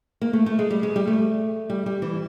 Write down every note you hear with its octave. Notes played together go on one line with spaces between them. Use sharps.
A#3
A3
A3
G#3
G3
G#3
G3
A3
G3
G3
E3